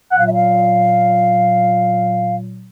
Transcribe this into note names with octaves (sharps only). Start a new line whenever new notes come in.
A#2 F#3 F#5
F5
E5
F5